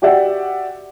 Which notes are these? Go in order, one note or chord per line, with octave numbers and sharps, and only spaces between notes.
F#4 G4 D5 E5 F#5 G5